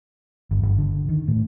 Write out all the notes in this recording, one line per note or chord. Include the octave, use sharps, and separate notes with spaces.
G1
G1
D3
D#3
A2